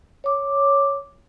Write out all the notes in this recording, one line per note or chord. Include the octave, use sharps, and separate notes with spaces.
C#5 D6